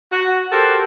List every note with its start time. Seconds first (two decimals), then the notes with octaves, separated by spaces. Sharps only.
0.12 F#4
0.51 F#4 G4 A4 A#4 C5